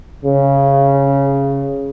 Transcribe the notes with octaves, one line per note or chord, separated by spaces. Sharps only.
C#3